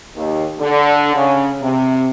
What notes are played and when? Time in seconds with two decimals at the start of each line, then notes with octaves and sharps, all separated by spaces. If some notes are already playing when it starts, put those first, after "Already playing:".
0.15 D#2
0.58 D3
1.15 C#3
1.61 C3